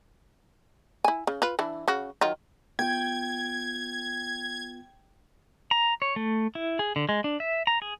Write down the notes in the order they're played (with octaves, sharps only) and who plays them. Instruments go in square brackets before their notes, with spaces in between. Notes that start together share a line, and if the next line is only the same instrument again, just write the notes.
[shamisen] E4 G#5
C#3
F4 B4
E3 D4 E4
C#3 F#4
D#3 F#3 F4
[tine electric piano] B3 F4 [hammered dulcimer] G5 [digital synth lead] G#6
[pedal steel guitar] A#5
C#5
A3
E4
G#4
D3
G#3
D4
E5
A#5
G#4